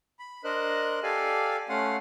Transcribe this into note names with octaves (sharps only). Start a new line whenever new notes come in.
B5
D4 A#4 C5 D#5 F#6
G4 A4 D5 F5 G#5
A3 C#4 F5 F#5 C6